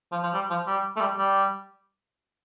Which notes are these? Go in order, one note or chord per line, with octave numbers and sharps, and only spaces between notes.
F3
F3
G3
F3
G3
A3
G3
G3